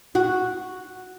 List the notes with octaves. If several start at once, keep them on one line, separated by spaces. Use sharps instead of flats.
F#4